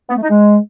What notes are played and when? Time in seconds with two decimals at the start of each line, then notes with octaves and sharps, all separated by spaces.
0.10 B3
0.16 A3
0.23 D#4
0.30 G#3